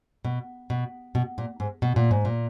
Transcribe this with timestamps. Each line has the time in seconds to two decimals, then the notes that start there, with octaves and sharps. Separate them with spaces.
0.25 B2
0.70 B2
1.15 B2
1.38 A#2
1.60 G#2
1.82 B2
1.96 A#2
2.11 G#2
2.25 A#2